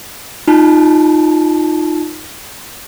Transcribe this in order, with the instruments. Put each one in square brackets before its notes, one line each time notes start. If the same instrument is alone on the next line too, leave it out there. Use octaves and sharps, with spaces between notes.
[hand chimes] D#4 F4 A5